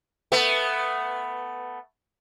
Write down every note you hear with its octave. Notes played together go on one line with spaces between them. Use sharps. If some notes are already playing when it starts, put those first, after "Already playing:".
A3 B3